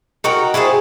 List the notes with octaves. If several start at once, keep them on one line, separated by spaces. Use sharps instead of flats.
D#4 F#4 A#4 G5
E4 G#4 C5 A5